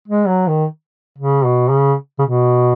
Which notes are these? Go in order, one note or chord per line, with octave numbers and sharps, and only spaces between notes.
G#3
F#3
D#3
C#3
B2
C#3
C#3
B2